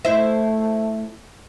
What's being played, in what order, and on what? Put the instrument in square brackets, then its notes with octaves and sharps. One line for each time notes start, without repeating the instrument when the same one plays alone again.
[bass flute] A3 [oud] E4 C5 E5